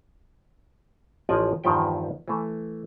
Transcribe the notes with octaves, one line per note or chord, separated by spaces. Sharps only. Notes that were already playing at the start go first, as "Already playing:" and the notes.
A1 F3 C5 D5 D#5 G#5
E2 G2 D#3 F3 G4 G5
E3 A3